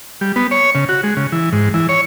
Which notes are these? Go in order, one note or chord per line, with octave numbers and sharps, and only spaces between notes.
G3
B3
C#5
C#3
F#4
G#3
C#3
E3
G#2
E3
C#5